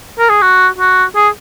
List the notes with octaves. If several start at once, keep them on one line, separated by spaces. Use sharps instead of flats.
A#4
G#4
F#4
F#4
G#4